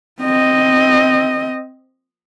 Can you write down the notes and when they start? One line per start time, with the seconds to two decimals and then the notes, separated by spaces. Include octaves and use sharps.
0.21 C4 D#5